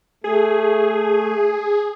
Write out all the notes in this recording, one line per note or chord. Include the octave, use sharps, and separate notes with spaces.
A3 G#4